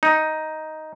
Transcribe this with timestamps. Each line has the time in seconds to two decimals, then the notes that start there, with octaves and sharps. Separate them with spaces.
0.03 D#4